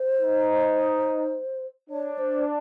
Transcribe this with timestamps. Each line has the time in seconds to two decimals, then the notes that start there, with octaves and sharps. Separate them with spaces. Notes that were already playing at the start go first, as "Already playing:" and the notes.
Already playing: C5
0.21 D#4
1.90 D4 C#5
2.18 C5